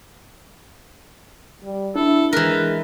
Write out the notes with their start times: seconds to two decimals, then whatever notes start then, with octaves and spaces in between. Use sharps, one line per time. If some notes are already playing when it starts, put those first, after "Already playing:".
1.63 G3
1.96 D4 E4 A4
2.33 E3 G#3 A#4 B4